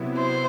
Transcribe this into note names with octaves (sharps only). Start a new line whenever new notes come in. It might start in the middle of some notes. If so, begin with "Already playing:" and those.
Already playing: C3 F#3 B3 E4
C5